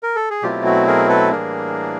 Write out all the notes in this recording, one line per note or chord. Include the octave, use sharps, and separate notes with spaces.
A#4
A4
G#4
B2 F#3 A3 C4 E4 F4 G4
F#4
G#4 A#4
A4 B4
A2 E3 G3 A#3 D4 G#4 A#4